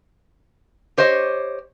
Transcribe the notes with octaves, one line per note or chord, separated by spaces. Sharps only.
G4 C5 C#5 D#5